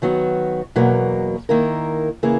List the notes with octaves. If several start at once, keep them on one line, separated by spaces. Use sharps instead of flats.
D#3 F#3 B3 F#4
E2 B2 F#3 A#3
D#3 A#3 E4 A#4
C#3 E3 A#3 E4 G#4